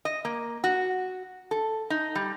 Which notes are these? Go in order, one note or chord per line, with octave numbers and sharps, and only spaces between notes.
D#5
A#3
F#4
A4
D#4
G3